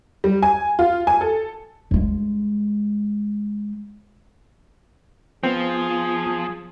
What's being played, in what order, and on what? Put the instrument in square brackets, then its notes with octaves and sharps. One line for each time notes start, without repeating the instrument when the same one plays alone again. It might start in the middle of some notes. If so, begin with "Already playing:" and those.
[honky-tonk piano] G3
G#5
F4
G#5
A4
[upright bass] G2 G#3
[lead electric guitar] F3 [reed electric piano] B3 G6 [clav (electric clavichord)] C4 [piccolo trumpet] G#4